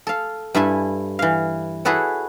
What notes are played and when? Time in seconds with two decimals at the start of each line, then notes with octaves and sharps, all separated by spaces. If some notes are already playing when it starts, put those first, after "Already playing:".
0.07 A4 F5
0.55 G2 E4 A4 G#5
1.19 E3 F5
1.85 E4 F#4 G#4 A4 B4 C#5